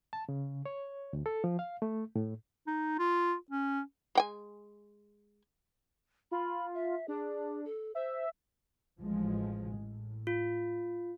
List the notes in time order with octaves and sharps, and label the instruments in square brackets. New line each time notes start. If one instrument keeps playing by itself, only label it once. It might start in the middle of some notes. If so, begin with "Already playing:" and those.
[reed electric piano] A5
C#3
C#5
D2
A4
F3
F5
A3
A2
[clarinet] D#4
F4
C#4
[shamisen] G#3 G5 G#5
[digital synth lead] F4 [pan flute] B5
[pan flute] E5
[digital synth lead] D4 [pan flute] G#4
[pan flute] A4
[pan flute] C5 [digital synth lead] E5
[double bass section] A1 F3 G#3
A2
[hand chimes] F4